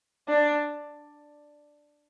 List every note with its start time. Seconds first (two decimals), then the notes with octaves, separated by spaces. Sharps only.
0.28 D4